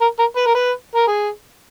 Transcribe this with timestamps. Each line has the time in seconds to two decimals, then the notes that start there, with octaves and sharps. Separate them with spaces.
0.01 A#4
0.19 A#4
0.37 B4
0.47 A#4
0.55 B4
0.95 A#4
1.08 G#4